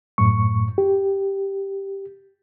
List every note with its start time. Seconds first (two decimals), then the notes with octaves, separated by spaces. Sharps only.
0.18 F#2 A2 C#6
0.78 G4